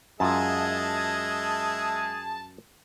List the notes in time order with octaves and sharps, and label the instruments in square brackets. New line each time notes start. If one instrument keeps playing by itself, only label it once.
[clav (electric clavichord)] F#2 F4 [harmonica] G#3 D#5 E5 [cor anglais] G#4 [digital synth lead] A5